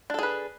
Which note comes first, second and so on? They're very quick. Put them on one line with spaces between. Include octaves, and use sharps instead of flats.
D4 A4 G#4 B4